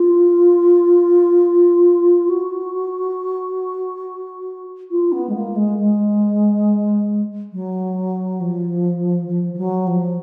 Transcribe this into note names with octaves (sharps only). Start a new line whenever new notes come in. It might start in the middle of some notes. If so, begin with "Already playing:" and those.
Already playing: F4
F#4
F4
B3
G#3
A#3
G#3
G#3
F#3
F3
F3
F3
F#3
F3